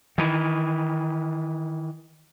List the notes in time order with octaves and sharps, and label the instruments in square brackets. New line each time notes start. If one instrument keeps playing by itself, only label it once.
[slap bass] D#3 E3